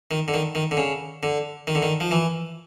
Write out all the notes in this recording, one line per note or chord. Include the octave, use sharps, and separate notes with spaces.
D#3
D3
D#3
D#3
D3
C#3
D3
D#3
D3
D#3
F3
E3